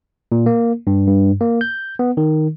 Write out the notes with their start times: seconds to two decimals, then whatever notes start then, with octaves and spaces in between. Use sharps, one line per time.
0.32 A#2
0.46 A#3
0.87 G2
1.08 G2
1.41 A#3
1.61 G6
1.99 B3
2.17 D#3